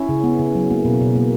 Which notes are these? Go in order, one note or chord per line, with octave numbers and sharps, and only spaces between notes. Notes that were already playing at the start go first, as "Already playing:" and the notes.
Already playing: C#4 E4
C#3
B3
C#3
F#3
A#3
B2
B2
A#3